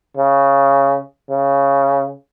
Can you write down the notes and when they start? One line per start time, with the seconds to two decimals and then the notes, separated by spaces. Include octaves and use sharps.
0.17 C#3
1.31 C#3